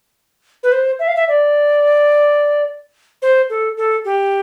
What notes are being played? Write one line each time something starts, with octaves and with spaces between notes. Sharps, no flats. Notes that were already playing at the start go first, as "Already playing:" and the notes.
B4
C5
E5
F5
E5
D5
C5
A4
A4
G4